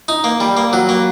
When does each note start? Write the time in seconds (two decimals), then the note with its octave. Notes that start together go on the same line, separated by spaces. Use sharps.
0.08 D#4
0.24 A#3
0.40 G3
0.57 A#3
0.73 F#3
0.89 A#3